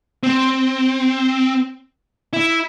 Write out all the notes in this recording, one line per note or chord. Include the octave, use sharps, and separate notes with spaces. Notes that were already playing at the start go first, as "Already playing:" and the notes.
C4
E4